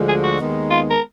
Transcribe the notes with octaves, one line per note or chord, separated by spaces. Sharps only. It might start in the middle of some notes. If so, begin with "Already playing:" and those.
Already playing: D2 D3 F3 G#3
G#4
F#4
D#2 D#3 G#3 B3 D#4
F4
A#4